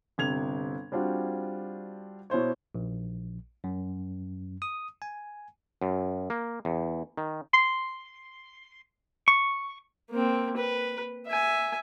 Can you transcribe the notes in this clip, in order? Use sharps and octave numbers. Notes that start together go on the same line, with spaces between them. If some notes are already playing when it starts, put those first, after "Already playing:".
G1 C3 G#6 F7
G3 C4 D4 F4 F#4
B2 E4 C5 C#5
A#1
F#2
D#6
G#5
F#2
A#3
E2
D#3
C6
C#6
A#3 C4
B4
E5 G#5